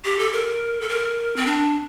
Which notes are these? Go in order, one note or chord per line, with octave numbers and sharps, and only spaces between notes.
G4
A4
A#4
A4
A#4
C4
D4